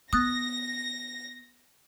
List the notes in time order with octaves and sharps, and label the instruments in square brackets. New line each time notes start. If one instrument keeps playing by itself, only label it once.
[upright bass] B3 [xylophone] D#6 F#6 A6 [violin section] A#6